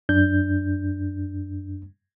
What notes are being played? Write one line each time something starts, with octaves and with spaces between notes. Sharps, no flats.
F#2 D4 G6